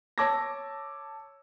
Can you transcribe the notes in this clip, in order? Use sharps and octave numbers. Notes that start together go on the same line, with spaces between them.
C#5 A5 D6 E6 G#6 A#6